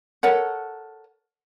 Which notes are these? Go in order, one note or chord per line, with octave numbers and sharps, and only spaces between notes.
A4 A#4 C#5 F#5